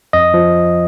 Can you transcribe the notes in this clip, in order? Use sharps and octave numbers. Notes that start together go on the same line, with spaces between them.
F2 D#5
F3